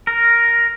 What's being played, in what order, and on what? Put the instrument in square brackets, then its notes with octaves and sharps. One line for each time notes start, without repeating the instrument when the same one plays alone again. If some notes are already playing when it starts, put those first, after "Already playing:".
[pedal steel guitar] A#4